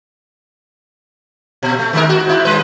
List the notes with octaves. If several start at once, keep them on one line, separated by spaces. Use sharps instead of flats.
A#2
A3
D#3 G#3 A#4
F#4
G#2 E4
D#2 G3 B4